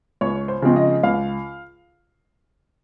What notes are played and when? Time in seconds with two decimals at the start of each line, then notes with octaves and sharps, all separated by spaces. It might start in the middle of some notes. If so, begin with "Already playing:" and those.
0.21 C#2 C#5
0.48 C5
0.62 C#3 F3 G#3 C4
0.76 D#5
1.03 C#2 F5